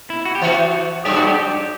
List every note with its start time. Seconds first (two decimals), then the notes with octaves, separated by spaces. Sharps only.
0.10 E4
0.25 F#4
0.35 G4
0.42 E3 F#4
1.05 F#2 G4
1.17 F#4
1.27 G4